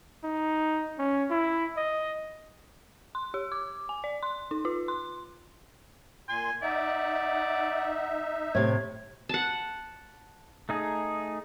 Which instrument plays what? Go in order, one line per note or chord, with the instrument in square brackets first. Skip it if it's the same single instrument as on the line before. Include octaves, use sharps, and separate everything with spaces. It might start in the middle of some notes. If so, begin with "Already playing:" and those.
[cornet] D#4
C#4
E4
D#5
[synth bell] C6
G4
D6
G#5
D5
C6
D#4
F4
C6
[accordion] A#2 C6 [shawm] G#5
[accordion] D#4 E5 [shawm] D5 [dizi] F#5
[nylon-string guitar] A2 C3 [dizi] G#6
[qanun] F#5 A5
[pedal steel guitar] A3 D#4 G#4